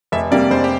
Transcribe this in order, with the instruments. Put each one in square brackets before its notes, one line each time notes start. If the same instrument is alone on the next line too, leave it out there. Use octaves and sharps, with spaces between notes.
[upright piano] F1 [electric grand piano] E5
[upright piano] F2 C3 G3 A#3 [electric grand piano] D5
[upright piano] F1 [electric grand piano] C5
[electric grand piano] G4